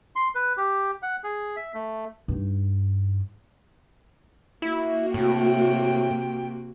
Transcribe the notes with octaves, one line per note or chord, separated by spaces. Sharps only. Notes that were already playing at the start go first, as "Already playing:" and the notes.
C6
B4
G4
F#5
G#4
E5
A3
G2 D#4
A#3 E4 F#4
A2 C3 G5